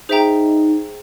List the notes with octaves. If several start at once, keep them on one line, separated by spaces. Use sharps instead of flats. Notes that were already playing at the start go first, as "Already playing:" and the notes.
D#4 G#4 C5 E5 G5 A#5